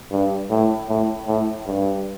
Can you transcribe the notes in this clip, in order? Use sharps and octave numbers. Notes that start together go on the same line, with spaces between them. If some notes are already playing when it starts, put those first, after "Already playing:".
G2
A2
A2
A2
G2